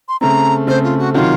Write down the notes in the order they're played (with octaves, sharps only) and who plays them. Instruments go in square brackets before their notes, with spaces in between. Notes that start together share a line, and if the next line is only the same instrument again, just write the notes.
[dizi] C6
[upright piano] C#3 A3 C4 [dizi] A#5
[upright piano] C#3 A3 C4 [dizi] C5
[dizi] F4
F#4
[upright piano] C3 D#3 F#3 [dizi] F4